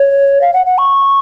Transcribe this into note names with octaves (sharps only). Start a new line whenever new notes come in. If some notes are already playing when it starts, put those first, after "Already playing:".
Already playing: C#5
F5
F#5
F#5
C#6